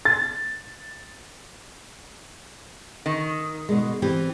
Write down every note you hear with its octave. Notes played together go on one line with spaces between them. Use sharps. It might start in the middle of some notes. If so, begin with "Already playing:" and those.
A6
D#3
B2 G#3
E3 C4 G4